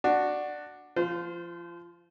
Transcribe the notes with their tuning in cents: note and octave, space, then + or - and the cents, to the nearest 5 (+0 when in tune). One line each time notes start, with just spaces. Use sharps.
D4 +10 F#4 +0
F3 -25 F4 +10 C5 -30